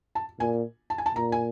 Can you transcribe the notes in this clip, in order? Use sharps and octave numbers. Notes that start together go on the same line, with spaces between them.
A5
A#2 G#5
A5
G#5
A5
A#2 A#5
G#5